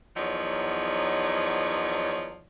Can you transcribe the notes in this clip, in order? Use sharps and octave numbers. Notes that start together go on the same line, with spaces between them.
E2 F3 F#3 D#4 C#5 D5